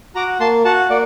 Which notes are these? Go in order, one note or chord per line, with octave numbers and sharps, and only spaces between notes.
F#4 A#5 D6
A#3 A5 C6
F#4 F#5 A5
A#3 D5 F#5